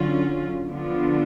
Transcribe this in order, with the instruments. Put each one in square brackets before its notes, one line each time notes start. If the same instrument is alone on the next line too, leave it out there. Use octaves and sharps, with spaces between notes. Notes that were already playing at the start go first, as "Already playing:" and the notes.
Already playing: [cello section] D3 F#3 C#4 F4
D3 F3 B3 D4 F4